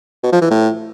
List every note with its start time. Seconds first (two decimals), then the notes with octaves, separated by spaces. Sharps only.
0.23 B2
0.32 F3
0.42 E3
0.51 A2